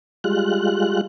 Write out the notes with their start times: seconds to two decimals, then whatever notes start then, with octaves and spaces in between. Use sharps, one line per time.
0.24 G3 G#3 F4 F#6